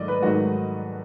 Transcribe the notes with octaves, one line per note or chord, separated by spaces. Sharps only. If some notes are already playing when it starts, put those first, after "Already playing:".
Already playing: G#2 D#3 F#3 A3 D5 D#5
B4
G#2 D#3 F#3 A3 F#4